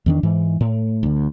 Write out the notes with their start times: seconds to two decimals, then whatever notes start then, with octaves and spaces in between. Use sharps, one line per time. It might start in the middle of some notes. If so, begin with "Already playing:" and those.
0.06 E2 D#3 D4
0.23 G#2 E3
0.61 A2
1.03 D2 D3